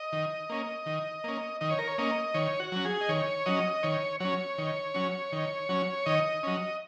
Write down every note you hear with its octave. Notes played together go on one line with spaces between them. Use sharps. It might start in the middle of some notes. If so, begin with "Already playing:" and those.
Already playing: D#5
D#3
A#3 C#4
D#3
A#3 C#4
D#3 D#5
C#5
A#4
C#5
A#3 C#4 D#5
D#3 C#5
F#4
F#3 C#4
G#4
D#5
D#3 C#5
F#3 C#4 D#5
D#3 C#5
F#3 C#4 C#5
D#3
F#3 C#4
D#3
F#3 C#4
D#3 D#5
F#3 C#4